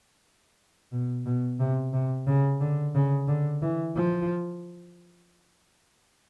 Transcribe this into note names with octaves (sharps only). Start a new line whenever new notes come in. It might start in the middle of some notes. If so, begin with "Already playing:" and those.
B2
B2
C3
C3
C#3
D3
C#3
D3
E3
F3